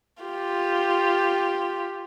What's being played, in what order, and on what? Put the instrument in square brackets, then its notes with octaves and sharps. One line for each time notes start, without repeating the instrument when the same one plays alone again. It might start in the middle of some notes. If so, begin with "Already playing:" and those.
[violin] F4 G4